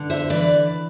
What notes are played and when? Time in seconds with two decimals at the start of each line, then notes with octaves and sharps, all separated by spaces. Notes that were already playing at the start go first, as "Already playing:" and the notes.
Already playing: G2 D3
0.10 C5 E5
0.30 E3 B4 D5